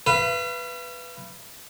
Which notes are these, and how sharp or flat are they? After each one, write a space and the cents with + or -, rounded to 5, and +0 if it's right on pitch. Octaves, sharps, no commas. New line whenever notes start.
B4 +0 F5 -45